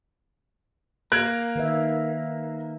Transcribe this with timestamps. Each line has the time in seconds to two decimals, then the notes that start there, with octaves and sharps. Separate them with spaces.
1.12 A#3 F#6 G#6 D7
1.56 D#3 B4 E5